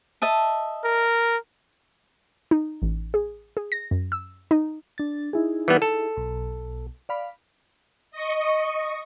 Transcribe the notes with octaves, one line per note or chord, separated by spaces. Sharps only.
D#5 E5 A5
A#4
D#4
A1
G#4
G#4
A#6
F#2
E6
D#4
D4 A6
D#4 E4 G#4
E3 G3 B3
A4
B1
D5 F5 B5
D#5 C#6